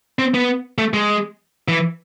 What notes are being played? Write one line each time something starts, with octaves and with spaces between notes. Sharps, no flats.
C4
B3
A3
G#3
E3